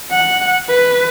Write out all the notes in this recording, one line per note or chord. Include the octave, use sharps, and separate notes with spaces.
F#5
B4